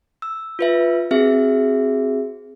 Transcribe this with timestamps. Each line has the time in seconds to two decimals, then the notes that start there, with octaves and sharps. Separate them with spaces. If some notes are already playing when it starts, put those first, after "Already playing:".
0.22 E6
0.59 F4 B4 E5
1.11 C4 F#4 G#4 E5